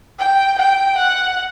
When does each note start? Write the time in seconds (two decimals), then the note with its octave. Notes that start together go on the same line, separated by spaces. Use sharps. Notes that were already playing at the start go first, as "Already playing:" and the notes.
0.19 G5
0.58 G5
0.98 F#5